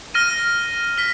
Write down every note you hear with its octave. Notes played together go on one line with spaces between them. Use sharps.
F6 A#6 D#7
F6 B6